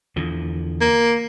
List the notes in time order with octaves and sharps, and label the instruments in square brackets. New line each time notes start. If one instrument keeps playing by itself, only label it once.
[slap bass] E2 D3 F3
[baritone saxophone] A#3